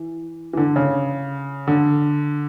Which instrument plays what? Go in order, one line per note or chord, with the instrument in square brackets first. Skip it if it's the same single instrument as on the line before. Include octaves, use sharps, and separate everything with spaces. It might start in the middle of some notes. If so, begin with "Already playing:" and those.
Already playing: [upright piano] E3
E3
D3
C#3
D3